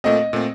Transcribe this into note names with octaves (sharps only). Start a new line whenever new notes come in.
A#2 A3 C4 D#5
A#2 A3 C4